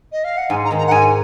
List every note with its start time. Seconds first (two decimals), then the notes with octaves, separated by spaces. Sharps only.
0.12 D#5
0.24 F5
0.37 F#5
0.50 G#2 G#5
0.64 A#5
0.71 D#3 G#3
0.78 A#5
0.87 F#5
0.91 G#2 G#5